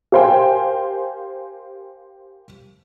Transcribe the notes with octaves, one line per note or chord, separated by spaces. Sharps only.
G4 A#4 C5 F5 G5 G#5